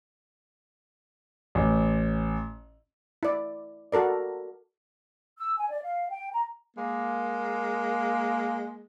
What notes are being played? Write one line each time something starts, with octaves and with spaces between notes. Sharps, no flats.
A1
E4 D5
F#4 A4 A#4 D5
E6
G#5
D5
F5
G5
A#5
G#3 A#3